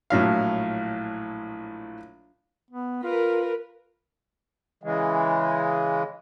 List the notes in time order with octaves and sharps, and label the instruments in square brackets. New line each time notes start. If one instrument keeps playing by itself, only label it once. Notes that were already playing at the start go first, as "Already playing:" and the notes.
[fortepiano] A#1 A2 F#3 F5
[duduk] B3
[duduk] F4 [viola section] A#4 B4
[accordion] C#3 E3 G#3